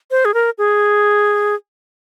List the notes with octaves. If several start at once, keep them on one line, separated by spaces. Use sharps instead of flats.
C5
G#4
A#4
G#4